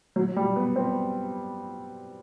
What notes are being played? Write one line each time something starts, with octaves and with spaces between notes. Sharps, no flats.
F#3
G3
B3
C4